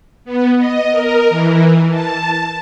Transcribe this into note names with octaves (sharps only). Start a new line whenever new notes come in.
B3
D#5
A#4
E3
A5